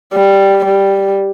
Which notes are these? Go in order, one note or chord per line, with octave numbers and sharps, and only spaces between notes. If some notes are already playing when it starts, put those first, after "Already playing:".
G3
G3